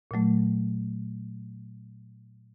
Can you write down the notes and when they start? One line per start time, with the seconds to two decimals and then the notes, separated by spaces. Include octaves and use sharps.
0.11 A#2 F#3 A3